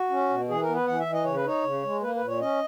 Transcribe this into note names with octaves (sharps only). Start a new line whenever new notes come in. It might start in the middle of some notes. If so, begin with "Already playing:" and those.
Already playing: F#4
C#4
B2
E3 G#4
A#4
B3
B4
E3 F#5
E5
E3
D#5
C#3 C#5
B4
D#4 C#5
C#3
G#3
A#3 B4
B4
A#2
C#5
C#4 D#5